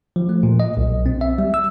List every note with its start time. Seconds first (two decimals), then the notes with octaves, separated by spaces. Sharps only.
0.16 F3
0.29 A3
0.43 A#2
0.60 D#5
0.77 B1
0.90 B1
1.06 C4
1.21 E5
1.38 G3
1.54 E6